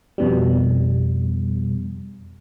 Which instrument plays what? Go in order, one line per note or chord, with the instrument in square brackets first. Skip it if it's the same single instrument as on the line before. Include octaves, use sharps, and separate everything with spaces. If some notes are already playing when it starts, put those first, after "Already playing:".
[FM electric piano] F2 B2 G3